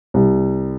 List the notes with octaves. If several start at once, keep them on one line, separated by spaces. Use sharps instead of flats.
C2